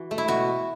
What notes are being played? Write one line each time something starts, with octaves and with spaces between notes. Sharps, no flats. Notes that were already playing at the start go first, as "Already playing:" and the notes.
Already playing: E3 F#4
A3
E4
B2 F#4